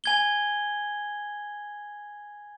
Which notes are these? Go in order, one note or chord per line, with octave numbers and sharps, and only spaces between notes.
G#5 G#6 G7